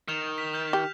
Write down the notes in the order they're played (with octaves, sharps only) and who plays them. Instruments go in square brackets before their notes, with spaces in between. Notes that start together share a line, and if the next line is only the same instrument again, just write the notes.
[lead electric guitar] D#3 [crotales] F6 E7 F7
[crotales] B6
F6 G6 F7
[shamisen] G4 [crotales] F6 G6